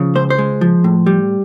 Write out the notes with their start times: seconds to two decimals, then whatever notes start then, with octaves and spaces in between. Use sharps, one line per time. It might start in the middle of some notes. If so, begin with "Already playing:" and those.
Already playing: C#3 F3
0.15 C#2 C5
0.30 C5
0.38 G#3
0.61 F3
0.84 A2
1.06 G3